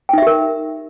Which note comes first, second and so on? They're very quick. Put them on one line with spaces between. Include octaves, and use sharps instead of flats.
G5 D#4 E5 G4 A#4